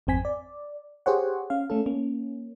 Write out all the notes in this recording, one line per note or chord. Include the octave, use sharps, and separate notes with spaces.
G#1 F2 C4 G#5 B6
D5
G4 G#4 C5 C#5 F#5
C#4 F5
A3 C#4 A4
A#3 C#4